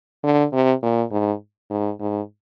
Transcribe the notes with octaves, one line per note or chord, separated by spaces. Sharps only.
D3
C3
A#2
G#2
G#2
G#2